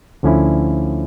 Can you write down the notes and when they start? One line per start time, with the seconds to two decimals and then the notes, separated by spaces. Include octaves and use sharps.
0.23 D2 D3 F3 C#4 E4